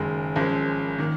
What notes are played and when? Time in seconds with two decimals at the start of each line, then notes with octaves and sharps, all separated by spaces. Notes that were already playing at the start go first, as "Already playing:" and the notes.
Already playing: F#1 F#2 D#3 G#3
0.36 G#1 F#2 F3 G#3
0.99 D#3 A#3